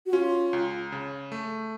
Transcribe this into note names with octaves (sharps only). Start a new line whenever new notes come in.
F#4
C#4 F4
C#2
C#3
A3